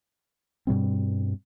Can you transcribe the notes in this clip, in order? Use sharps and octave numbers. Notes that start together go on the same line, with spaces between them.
G2 B2 G3 C4